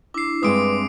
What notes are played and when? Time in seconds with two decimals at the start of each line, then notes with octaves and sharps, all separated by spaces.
0.14 D4 E4 D6 C7
0.43 G2 G#3 C4 B4 E5 D#6 D7